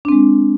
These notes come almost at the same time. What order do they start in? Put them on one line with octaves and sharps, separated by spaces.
D4 C4 G#3